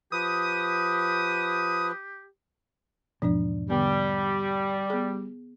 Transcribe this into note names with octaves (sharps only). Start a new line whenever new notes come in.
F3 G4 B4 D#6
E2 G#2 B2 F3 D4 D5
D3 G3 B3
B3 G#4